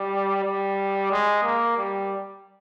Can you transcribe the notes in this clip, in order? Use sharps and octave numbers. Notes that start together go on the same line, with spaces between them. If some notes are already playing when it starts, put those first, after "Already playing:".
Already playing: G3
G3
G#3
A#3
G3